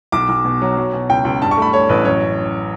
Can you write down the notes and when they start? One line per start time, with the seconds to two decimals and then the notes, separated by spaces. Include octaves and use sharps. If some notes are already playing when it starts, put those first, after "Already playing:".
0.12 B1 D6
0.29 B1
0.45 B2
0.62 F#3
0.77 F#3
0.93 B2
1.09 C#2 G5
1.25 C#2
1.42 G2 A5
1.51 C#6
1.57 A3 B5
1.73 A3 C#5
1.89 A1 B4
2.05 F#2 C#5